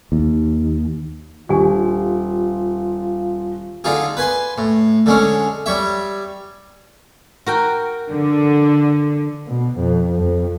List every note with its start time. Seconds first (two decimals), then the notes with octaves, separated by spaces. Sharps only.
0.12 D#2
1.49 D#1 D4 F4 G4 G#5
3.84 D3 D#4 F4 G#4
4.17 B4 G#5 C6
4.58 A2
5.06 D3 G#3 C#4
5.66 G3 C#5 E5
7.46 F#4 A#4 G5
8.11 D3
9.47 B2
9.79 F2
10.19 F2